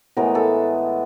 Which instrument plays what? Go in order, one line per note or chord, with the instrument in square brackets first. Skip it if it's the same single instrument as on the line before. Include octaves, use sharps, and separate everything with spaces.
[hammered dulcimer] A2 E3 G#3 B3 A#4
A4